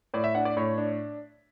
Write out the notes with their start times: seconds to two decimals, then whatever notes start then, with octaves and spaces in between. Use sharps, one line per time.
0.14 A2 D5
0.24 E5
0.35 D4 F#5
0.45 D5
0.57 A2 C#5
0.78 D4